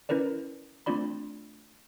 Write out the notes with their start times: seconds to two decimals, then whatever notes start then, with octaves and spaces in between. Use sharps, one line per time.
0.09 C#4 E4 A#4 B4 D5
0.86 A3 C4 D4 F4 D5 B5